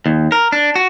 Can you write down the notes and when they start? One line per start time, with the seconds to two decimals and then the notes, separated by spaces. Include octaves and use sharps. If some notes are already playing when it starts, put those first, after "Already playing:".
0.06 D#2
0.32 A#4
0.52 D4
0.75 F#4